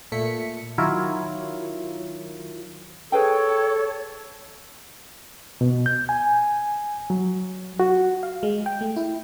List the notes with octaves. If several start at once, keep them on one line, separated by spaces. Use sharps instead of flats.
A#2 A3 B6 C#7
D#3 F#3 E4 F4 A#4 C#5
G#4 A4 B4 C#5 G5
B2
G6
G#5
F#3
F#4
F5
G#3
G5
A3
E4